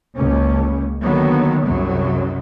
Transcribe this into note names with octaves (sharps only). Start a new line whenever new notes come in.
F#1 C#2 C#4
D3 D#3 F#3 A#3 B3
C2 F#2 C#3 F#3